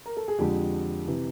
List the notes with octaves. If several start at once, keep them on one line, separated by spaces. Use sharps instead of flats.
A#4
A4
G#4
F2 D3 F3 G#3 G4
C3 E3